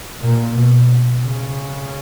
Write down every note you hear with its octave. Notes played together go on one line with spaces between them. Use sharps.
A#2
B2
C#3